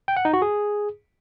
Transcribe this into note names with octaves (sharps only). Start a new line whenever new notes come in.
G5
F#5
D#4
F#4
G#4